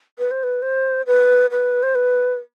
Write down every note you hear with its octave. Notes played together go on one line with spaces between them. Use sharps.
B4
C5
B4
C5
B4
B4
C5
B4